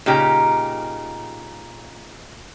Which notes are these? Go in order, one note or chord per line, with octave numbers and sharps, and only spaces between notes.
A#2 C#3 D#4 G4 A#5